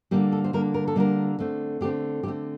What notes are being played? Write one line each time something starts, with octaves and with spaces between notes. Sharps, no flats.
D3 G3 A#3 G4
A4
C5
D3 G3 A#3 A#4
A#4
A4
D3 G3 A#3 A#4
D3 A3 C4
D3 A3 C4 G4
D3 A3 C4 G4